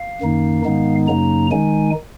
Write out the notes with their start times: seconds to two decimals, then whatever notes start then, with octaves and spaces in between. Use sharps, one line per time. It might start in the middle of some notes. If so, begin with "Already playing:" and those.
Already playing: F5
0.21 F#2 D#3 A#3 D#4
0.65 G#2 D#3 G#3 B3 D#4
1.08 F#2 C#3 F#3 A#3 D#4 A#5
1.51 D#3 G#3 D#4 G#5